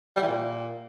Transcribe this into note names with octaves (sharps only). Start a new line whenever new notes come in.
G3
E3
A#2